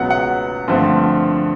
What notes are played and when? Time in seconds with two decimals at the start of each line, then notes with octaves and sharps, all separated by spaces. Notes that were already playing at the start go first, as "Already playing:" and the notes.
Already playing: C#2 B2 F#3 B3 F#5
0.10 F#5
0.68 G2 D3 F3 A3 C4